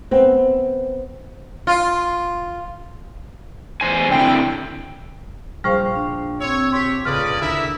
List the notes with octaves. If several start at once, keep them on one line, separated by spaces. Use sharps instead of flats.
B3 C4
F4
E2 C5 G#5
D3 C4 E4 G5
A#1 G3 C5 F5 G5 C#6 F6 C7
D4
C4 C#5 E6
G4 C#5 C6 B6
C#2 A2 C#4 G#4 B4 D5 D#6 F6
D2 D3 D#3 E4 A#4 E5